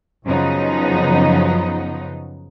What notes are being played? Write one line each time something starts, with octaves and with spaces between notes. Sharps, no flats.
F#2 C#3 F3 F#3 B3 D#4